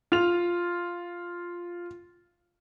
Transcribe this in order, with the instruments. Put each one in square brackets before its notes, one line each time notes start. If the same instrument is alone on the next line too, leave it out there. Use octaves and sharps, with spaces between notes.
[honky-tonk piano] F4 F7